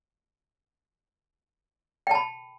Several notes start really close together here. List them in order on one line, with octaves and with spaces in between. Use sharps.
G5 A5 B5